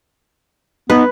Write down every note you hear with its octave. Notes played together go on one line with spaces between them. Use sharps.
B3 D#4 B4